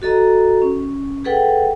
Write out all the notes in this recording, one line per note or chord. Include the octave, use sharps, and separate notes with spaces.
F#4 A4 D#5 A#5
C#4
G#4 A4 B4 F#5 G5